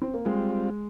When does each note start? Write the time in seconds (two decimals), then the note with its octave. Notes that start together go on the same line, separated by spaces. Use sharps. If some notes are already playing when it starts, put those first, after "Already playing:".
0.02 C4
0.14 A#3
0.25 G3 G#3 C4 F4